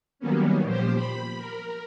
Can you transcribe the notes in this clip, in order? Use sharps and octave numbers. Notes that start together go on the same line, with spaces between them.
D#3 F#3 G3 A#3 B3 C#4
A#2 F3 G4 C5
B5
A#4